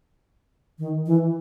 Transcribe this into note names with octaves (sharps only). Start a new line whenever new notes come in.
D#3
E3